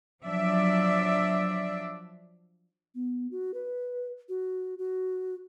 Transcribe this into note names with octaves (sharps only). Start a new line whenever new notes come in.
F3 F#3 D4 D5 E5
B3
F#4
B4
F#4
F#4